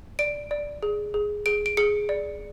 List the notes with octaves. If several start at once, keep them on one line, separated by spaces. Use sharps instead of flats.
D5 D7
D5
G#4
G#4
G#4 D7
D7
G#4 C#7
D5